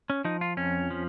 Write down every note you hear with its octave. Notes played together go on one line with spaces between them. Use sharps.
C#4
F3 D#4
F4
F2 C#4
F3